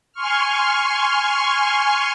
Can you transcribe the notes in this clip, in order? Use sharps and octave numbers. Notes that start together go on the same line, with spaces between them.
G#5 C6 C#6 F6